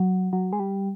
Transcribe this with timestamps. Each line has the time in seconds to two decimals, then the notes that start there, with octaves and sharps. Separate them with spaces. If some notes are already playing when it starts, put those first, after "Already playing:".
Already playing: F#3
0.33 F#3
0.53 G#3
0.60 G3